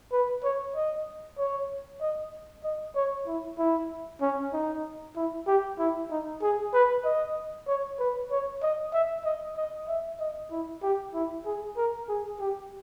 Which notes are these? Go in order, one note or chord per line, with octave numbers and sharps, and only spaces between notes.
B4
C#5
D#5
C#5
D#5
D#5
C#5
E4
E4
C#4
D#4
E4
G4
E4
D#4
G#4
B4
D#5
C#5
B4
C#5
D#5
E5
D#5
D#5
E5
D#5
E4
G4
E4
G#4
A#4
G#4
G4